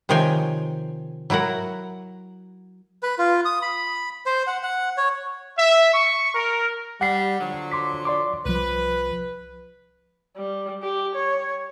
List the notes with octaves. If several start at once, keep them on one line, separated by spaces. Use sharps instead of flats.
C3 D#3 F3 C#5 G5 G#5
F#3 E4 F#4 A#4 F#5
B4
F4
D#6
B5
C5
F#5
F#5
C#5
E5
C#6
A#4
G3 F#5 C7
D3 F3 F#3
C6 D6 B6
D5 C6 D6
C2 F3 B4
G3
G4
C#5